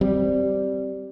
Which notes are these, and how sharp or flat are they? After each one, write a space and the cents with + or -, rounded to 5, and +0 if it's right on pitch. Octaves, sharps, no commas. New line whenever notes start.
G3 -5 C4 +0